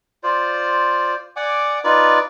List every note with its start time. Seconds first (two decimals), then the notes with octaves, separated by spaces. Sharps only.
0.23 F4 C5 D5
1.36 D5 F#5 G#5 D6
1.84 D#4 F4 B4 D5